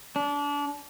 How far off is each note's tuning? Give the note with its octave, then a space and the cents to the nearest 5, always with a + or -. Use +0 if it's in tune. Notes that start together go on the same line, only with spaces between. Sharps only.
D4 -30